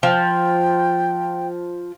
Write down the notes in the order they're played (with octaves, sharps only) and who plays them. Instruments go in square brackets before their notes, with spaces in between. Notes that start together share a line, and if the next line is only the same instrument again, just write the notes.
[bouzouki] F3 [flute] G5